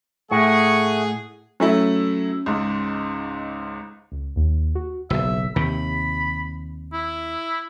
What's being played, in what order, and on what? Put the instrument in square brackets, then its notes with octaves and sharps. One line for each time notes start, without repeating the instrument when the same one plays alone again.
[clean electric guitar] A2 [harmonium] A3 F#5 [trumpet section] G#4 [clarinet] C#6
[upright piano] F#3 A3 E4 [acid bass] C#4
[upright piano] C#2 G#2
[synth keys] C#2
D#2
F#4
[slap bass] F#1 B1 [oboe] E5
[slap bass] D#2 C3 D#3 [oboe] B5
[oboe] E4